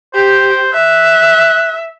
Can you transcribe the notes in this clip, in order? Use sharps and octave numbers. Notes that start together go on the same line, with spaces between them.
G4 C5
E5 F#6